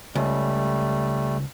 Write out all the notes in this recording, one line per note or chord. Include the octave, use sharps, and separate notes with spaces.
C#2 G3 A3